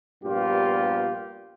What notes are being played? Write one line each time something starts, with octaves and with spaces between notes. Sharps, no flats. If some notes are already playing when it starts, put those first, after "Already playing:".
A#1 G2 A#2 B3 F4 G4